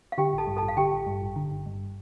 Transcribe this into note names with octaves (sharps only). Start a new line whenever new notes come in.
F5
D3 G4 G5
A1
A4 A5
G2
A4 A5
A1
F5
D3 G4 G5
A1
G2
A1
D3
G1
G2